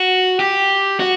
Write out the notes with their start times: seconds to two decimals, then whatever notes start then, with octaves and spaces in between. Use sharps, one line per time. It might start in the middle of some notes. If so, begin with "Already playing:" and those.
Already playing: F#4
0.40 G4
1.00 F#4